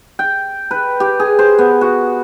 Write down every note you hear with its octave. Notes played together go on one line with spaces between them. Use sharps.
G5
B4
G4
G#4
C5
B3
F#4